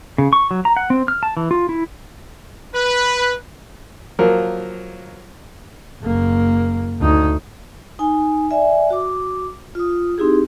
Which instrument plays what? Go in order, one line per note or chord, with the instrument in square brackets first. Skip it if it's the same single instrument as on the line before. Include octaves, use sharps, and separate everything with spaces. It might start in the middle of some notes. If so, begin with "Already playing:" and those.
[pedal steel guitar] C#3
C#6
F#3
A#5
F#5
C4
F6
A5
E3
F4
E4
[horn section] B4
[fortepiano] F3 F#3 A#3 A#4
[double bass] F#1 A#3
D2 D#4
[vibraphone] D#4 G#5
D5 E5 G#5
F#4 D6
F4 D#6
C4 D#4 E4 G4 G#4